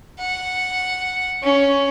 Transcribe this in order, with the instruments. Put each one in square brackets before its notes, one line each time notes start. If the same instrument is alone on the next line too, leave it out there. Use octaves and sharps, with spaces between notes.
[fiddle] F#5
C#4